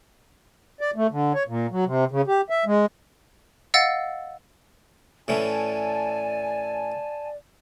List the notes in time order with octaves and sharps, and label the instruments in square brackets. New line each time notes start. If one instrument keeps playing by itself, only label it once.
[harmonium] D5
A3
D3
C#5
A#2
F#3
C3
C#3
G4
E5
G#3
[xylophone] D#5 F5 F#5 E6 A6
[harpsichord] A2 E3 C#4 [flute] D5 [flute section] G#5 A5